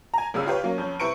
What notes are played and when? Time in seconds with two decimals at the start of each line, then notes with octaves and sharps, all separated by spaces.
0.14 G#5 A#5
0.34 G#1 C#2 C#3 G#4 D#6 E6
0.46 F4 G4 B4 C#5
0.63 F#3 A#3 C#4
0.78 F2 C#4 G6
1.00 C3 E4 B4 C#6 C#7 D7